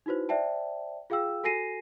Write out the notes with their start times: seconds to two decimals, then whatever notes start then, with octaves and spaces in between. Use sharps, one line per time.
0.06 D#4 E4 F#4 B4 C5
0.29 C5 D5 E5 G5 A5
1.10 F4 G#4 F5 G5 E6
1.44 F#4 A4 G#5 A#6 C7 D#7